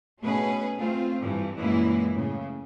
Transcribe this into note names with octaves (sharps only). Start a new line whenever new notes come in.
B2 A3 C#4 G#4 B4
A3 C4 F4
G2 E3
F#2 A#2 E3 G#3 A#3 E4
A2 C#3